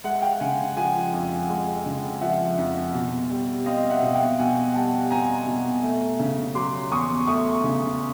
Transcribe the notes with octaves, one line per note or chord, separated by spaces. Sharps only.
G#3 E5 F#5
F5 G5
C#3 F#5 G#5
F3 F#5 G#5
F2
G#3
C#3
F3 E5 F#5
F2
B2
G3
C4 D#5 F5
E5 F#5
B2
F5 G5
B2 F#5 G#5
G3 G5 A5
C4 G#5 A#5
B2
A3
C#3
F#3 C6 D6
E2 C#6 D#6
A3 C#6 D#6
C#3